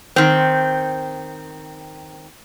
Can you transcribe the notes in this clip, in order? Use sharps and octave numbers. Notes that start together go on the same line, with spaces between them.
D#3 C4